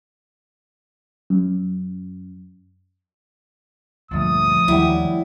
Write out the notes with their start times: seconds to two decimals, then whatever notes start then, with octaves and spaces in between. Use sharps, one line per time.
1.30 F#2
4.11 D2 G2 A#2 F3 A3 D#6
4.68 D#2 D#3 F#3 G3 E4 G4